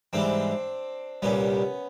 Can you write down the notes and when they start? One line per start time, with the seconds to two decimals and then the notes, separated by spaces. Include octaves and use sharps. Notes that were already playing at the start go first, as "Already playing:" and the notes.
0.13 G#2 E3 G3 C4 D4
1.22 C2 A#2 G3 B3 C#4